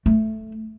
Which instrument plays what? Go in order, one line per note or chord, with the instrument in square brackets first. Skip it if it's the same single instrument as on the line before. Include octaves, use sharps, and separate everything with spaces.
[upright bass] A3